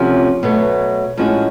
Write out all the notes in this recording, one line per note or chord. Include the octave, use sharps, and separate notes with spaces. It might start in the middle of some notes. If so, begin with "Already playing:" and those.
Already playing: C3 F3 A3 C#4 F#4
B2 F#3 A3
A2 F3 G#3 C#4 F#4